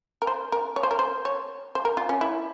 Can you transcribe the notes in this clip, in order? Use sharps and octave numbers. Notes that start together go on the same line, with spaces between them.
A#4
C5
A#4
C#5
C5
A#4
C5
C#5
C5
A#4
F4
C#4
E4